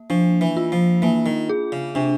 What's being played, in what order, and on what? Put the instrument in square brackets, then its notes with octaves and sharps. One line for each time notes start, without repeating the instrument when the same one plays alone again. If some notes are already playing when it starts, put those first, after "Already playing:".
Already playing: [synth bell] A#3
[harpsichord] F3 [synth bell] D4
[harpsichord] E3
[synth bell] F4
[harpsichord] F3
[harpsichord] E3 [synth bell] A#3
[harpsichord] D#3
[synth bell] G#4
[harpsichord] C#3
[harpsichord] C3 [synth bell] D4